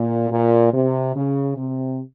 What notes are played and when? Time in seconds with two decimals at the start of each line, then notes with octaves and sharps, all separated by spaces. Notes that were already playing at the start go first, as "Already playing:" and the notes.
Already playing: A#2
0.30 A#2
0.72 C3
1.14 C#3
1.55 C3